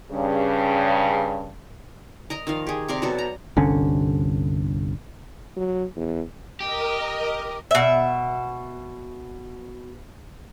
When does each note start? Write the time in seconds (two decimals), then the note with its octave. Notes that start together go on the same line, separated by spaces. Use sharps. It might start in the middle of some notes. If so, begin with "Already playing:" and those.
0.12 G2 C#3
2.30 A#4 D#5 A#5
2.47 D#3 F3 F5
2.67 G4 G#4
2.88 C3 A#4 D5 F5
3.02 B2 F#3 A4
3.18 A#5
3.57 G1 C2 D3 C#4
5.56 F#3
5.96 E2
6.60 G4 A#4 D#5
7.71 B2 E5